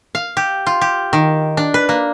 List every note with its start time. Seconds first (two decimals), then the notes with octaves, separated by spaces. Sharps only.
0.15 F5
0.37 G4
0.66 F4
0.81 G4
1.13 D#3
1.57 D4
1.74 B4
1.89 A#3